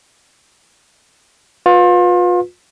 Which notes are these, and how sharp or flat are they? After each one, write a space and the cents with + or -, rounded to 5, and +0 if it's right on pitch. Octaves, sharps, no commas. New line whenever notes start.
F4 +30 B4 +0